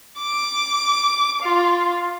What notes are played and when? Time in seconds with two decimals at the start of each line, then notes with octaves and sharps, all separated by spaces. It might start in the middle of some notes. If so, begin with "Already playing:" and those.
0.19 D6
1.41 F4